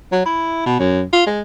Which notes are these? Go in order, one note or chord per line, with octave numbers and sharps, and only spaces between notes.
F#3
E4
B2
F#2
F4
G#3